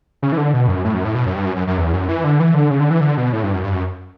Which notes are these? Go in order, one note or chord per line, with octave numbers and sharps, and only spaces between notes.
C#3
E3
D3
B2
F#2
A2
F#2
A2
B2
F#2
G2
F#2
F#2
F#2
E2
F#2
E3
D3
E3
D3
C#3
D3
E3
D3
B2
A2
G2
F#2
G2
F#2